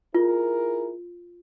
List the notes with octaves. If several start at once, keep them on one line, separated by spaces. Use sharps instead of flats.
E4 F4 G#4 A#4